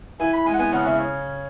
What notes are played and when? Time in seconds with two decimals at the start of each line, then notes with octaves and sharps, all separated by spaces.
0.20 E3 E4 G#5
0.33 B5
0.46 G#3 G#5
0.54 F#5
0.59 B3 G#5
0.72 C#3 C#4 F#5
0.85 C#3 C#4 E5
0.99 C#5